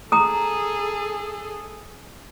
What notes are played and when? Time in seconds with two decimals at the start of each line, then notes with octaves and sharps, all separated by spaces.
0.12 G#4 A4 A#5 D#6